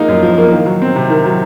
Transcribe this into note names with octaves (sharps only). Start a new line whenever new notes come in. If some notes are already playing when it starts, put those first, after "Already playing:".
Already playing: F3 G#3 A#3 D#4
F#2
F3
A#3
D#3
F#3
C4
C3
D#3
F#3